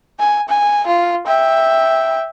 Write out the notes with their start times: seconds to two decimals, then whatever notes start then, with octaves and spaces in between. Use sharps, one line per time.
0.19 G#5
0.49 G#5
0.87 F4
1.27 E5 G5